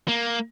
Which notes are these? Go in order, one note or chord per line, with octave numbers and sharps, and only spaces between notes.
A#3